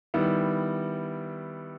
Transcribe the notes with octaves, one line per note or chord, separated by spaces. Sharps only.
D#3 G3 B3 E4